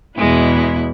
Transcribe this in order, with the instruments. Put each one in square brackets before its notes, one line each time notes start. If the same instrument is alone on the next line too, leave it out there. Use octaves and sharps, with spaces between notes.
[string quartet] E2 B2 B3 E4 [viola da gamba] G#3